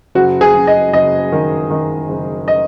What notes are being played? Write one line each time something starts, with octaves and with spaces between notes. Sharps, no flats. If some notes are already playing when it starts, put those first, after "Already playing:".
F#1 F#4
G#4
F#1
D#5
F#1 D#5
D#3
D#3
F#1
D#5